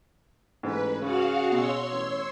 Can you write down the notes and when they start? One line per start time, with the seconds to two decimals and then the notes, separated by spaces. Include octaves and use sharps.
0.63 A1 G#2 B4
1.02 C#3 F#4 F5 F#5
1.52 B2 C#5 C6 E6
1.92 A1